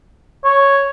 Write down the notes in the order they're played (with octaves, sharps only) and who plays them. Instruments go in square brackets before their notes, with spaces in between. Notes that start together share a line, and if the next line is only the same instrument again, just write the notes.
[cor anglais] C#5